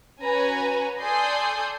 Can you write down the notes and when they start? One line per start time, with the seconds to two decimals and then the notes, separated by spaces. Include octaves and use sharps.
0.22 C#4 F#4 B4 G#5 A#5
1.00 A4 D5 G#5 C6 D#6 G6